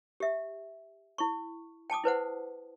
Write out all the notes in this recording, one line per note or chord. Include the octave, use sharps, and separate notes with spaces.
G4 E5
E4 C#6
G5 A5 D6 D#6
E4 B4 C5 F#5